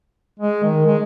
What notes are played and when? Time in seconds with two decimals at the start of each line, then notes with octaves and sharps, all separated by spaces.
0.40 G#3
0.64 D#3
0.86 G#3